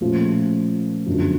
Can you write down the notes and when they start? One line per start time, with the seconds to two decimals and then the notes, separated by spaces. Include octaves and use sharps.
0.01 A#2 F3 A3 C#4
1.06 G1 F#2 D3 F3